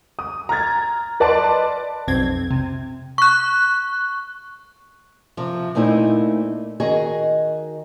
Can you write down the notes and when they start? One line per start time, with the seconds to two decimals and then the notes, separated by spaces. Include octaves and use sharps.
0.19 D#6
0.49 A#5 F6 G#6 A6
1.20 B4 D5 D#5 A5 C6
2.08 B1 F2 C4 G#6
2.51 C3
3.18 C#6 F#6
5.37 C3 F3
5.75 A#2 A3 C4 D#4 E4
6.80 D#3 F#4 G#4 D#5